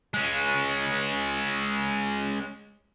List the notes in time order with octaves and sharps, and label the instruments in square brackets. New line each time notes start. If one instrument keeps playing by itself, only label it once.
[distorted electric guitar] G#3 C#4